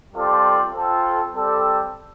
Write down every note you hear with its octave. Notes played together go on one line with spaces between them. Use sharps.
G3 C4 F4 A4 D5
C4 F4 A4
G3 C4 A4 D5